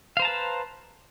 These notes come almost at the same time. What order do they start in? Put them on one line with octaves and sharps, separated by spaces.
F5 C5 A#5 A5 B4